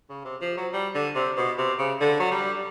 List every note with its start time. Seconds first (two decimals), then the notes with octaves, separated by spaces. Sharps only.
0.09 C#3
0.25 C3
0.41 F3
0.57 F#3
0.73 G3
0.95 D3
1.15 C3
1.37 B2
1.58 C3
1.79 C#3
2.00 D3
2.20 F#3
2.31 G3